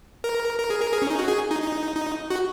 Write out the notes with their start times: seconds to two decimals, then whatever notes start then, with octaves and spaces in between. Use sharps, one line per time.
0.24 A#4
0.59 A#4
0.70 G#4
0.82 A#4
0.93 G#4
1.02 C#4
1.10 D#4
1.19 F#4
1.28 G#4
1.51 D#4
1.62 D#4
1.96 D#4
2.30 F#4